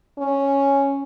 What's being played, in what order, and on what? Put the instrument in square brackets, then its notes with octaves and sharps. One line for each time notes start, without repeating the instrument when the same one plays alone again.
[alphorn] C#4